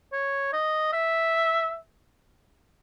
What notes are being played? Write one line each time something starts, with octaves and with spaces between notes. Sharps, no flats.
C#5
D#5
E5